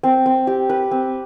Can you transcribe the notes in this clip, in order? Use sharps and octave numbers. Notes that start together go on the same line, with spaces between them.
C4
C4
G4
B4
C4